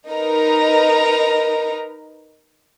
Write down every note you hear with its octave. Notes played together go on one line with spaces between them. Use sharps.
D#4 A#4 B4 A#5